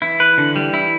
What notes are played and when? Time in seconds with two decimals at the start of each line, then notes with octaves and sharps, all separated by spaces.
0.02 E3 E4
0.20 B4
0.38 D3
0.56 G3
0.74 E4